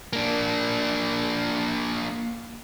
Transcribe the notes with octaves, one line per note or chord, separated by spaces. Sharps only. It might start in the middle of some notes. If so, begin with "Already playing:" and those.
A#3 D4